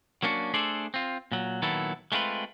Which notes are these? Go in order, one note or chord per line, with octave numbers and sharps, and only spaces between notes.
F#3 A#3 C#4 D4 F4 F#4
A3 D4 G#4 A4 C5 D5
C4 F4
A#2 F#3
A#2 D#3 F#3 B3 E4 A4
G#3 A3 C4 F4 B4